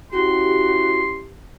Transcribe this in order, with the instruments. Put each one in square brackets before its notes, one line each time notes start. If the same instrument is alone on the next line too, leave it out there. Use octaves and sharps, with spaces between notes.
[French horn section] C#4 E4 G4 [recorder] F#4 [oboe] C6